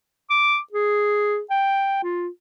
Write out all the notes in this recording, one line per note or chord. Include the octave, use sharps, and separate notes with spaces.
D6
G#4
G5
F4